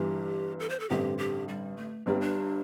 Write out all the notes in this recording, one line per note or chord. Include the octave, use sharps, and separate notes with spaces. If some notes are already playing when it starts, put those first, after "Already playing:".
Already playing: G1 G2 E3 G4
A4
C5
A4
A1 G2 D3 C4 G4
G4
G3
A3
G1 G2 G3 C4
D4